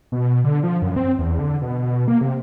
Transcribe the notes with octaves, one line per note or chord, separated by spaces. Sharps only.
B2
D3
F3
F#2
C4
E2
D3
B2
B2
A#3
C3